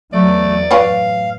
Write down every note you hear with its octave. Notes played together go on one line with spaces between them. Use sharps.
E2 F#3 A3 D5
F#2 A2 F4 B4 C#5 F5